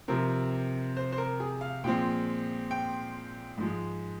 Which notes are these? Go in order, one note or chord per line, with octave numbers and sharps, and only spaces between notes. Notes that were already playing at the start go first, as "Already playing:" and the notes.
C3 F3 C4 A#4
C5
C5
A#4
G#4
F5
A#2 F3 G#3 C4 G5
G5
G#2 F3 G#3